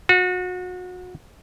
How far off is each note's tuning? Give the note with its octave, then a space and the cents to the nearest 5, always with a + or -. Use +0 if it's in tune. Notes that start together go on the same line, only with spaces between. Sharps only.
F#4 -30